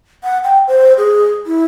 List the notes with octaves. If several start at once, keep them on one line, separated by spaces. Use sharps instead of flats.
F#5
G5
C5
G#4
E4